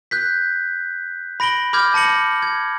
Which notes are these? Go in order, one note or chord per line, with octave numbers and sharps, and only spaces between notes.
F#6 G6 B6
B5 A#6 D7 F#7 G7
B5 D6 F6 G6 G#6
A5 A#6 C#7 F#7
G#6